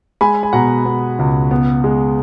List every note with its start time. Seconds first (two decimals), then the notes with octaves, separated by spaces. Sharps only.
0.21 G#3 G#5 B5
0.43 G#5
0.53 B2 F#5 A#5
0.85 B3
1.19 C#2
1.51 B3
1.84 G#3